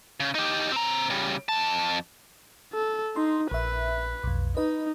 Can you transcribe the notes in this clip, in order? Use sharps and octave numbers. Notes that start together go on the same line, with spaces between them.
C#3
D#4 G4
C4 A#5
C#3 G3
F2 A5
A4
D#4 C6
A#1 B4 E5
B1 F2
D#4 B4 D#5